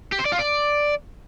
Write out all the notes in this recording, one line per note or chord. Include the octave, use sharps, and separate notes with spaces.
G4
C5
D5
F4
D5